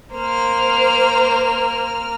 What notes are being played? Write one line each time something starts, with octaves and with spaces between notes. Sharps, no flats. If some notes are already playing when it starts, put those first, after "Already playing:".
A#3 C5 F6